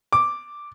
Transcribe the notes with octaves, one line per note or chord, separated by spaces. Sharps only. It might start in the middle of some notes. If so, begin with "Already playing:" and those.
D6